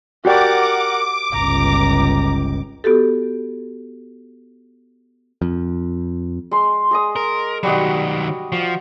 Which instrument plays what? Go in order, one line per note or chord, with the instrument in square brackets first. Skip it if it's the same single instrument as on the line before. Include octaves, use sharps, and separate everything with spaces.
[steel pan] F#4 G4 D5 [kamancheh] A#4 F#5 [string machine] D6
[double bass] G1 C#2 [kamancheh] A#5
[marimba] B3 F#4 G4 A4
[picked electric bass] F2
[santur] G#3 C6
G#4 D#5 D#6
[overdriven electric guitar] A#4
[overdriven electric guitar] D#3 F#3 [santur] G3 F#4 D#5
[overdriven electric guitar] F3 [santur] F#4